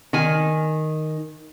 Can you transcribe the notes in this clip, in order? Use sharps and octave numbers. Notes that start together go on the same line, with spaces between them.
D#3 G#5